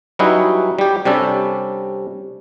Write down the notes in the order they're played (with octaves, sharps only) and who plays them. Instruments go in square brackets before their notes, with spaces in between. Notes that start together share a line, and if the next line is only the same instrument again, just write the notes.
[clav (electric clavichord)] F#3 G3 C#4 D#4 E4 B4
G3 G4
C3 G3 C#4 D4 A4